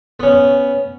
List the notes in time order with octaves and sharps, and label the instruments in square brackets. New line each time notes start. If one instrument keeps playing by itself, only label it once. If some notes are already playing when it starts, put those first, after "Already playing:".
[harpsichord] B3 C#4